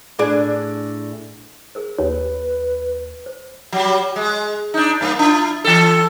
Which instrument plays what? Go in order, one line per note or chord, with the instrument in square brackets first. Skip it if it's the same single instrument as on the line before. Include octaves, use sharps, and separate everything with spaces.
[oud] A2 D4 G#4
[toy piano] G#4 A#4 C5
[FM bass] D#2 [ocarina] B4 [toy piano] C#5
[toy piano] C5
[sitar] F#3 G3
G#3
D4 D#4
G2 A#3
D4 E4 F4
E3 A4